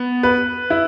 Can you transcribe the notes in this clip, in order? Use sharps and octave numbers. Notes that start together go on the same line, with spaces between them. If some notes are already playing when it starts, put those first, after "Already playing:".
Already playing: B3
B4
E4